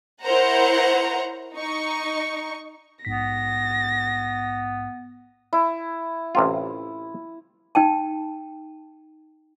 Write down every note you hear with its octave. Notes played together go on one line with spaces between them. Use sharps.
E4 A#4 C5 C#5 F#5 A#5
D#4 C#6
A#1 G#2 B3 A#6 B6
E4
A1 C3 F4
D#4 G5 A5